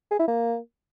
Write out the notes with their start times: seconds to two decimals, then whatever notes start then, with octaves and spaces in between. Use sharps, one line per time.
0.11 G#4
0.19 E4
0.28 A#3